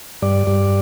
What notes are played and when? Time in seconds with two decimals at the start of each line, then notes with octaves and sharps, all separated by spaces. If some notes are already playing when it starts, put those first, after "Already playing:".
0.22 G2 D5
0.47 G2